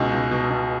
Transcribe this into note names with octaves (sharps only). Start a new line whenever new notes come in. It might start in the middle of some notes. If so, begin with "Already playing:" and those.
Already playing: C#2 B2 D#4
C#2
B2
B2